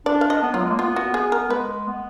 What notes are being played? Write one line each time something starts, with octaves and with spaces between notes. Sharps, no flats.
D4 D5
F5
D#5
B3
F#3 F4
G#3
A#3
B3 F4
F#4
B3 G#4
A#4
G#3 B4
B3